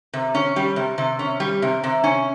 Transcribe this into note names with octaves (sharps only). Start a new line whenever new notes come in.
C3
C#4
G3
C3
C3
C#4
G3
C3
C3
C#4